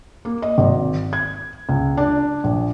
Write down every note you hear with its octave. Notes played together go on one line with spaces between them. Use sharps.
A#3
D#5
G#1
G#6
C#2
D4
A#1